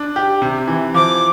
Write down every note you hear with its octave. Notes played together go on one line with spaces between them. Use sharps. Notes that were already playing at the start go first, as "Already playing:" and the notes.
Already playing: D4
G4
C3
E3
F3 D6